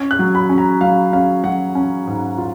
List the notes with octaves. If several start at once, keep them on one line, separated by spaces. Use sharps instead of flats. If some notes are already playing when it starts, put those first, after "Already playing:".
Already playing: C#4 G#6
F#6
F#3
B5
C#4
A#5
F#3 F5
C#4 F5
F#3 F#5
C#4
G#2
F4